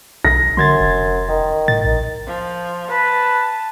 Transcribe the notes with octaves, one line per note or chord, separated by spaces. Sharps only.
B1 A#6
F#2 D3 C6 G#6 A6
F1
D#3
A2 A6
A#1 D#3
F3
B4 A5